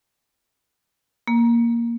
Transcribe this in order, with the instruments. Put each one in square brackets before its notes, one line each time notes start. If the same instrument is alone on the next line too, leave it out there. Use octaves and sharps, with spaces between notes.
[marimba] A#3